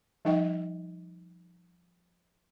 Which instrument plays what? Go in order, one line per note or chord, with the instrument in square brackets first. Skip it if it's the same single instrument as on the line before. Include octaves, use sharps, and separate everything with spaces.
[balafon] F3 G3 D#4 D#5 G5